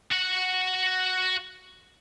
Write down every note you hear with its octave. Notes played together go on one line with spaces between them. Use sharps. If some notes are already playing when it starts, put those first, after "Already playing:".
F#4 F#5